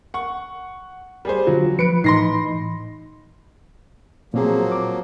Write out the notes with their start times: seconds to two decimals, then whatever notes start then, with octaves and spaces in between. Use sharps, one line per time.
0.14 F#5 C#6
1.25 G3 G#4 C5
1.47 D3 F#3 F4
1.79 F3 B4 C#7 D7
2.04 A2 E3 D#4 B5 C6 A#6 C7
4.34 A#2 F3 F#3 A#3 C4 G#4
4.72 D6